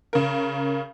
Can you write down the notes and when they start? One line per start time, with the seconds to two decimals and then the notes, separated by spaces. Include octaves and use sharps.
0.13 C#3 A#4